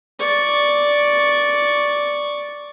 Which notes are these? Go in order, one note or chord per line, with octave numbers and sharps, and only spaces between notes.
D5 C#6